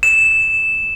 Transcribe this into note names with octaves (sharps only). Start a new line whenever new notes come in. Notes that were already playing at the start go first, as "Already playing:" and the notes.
E7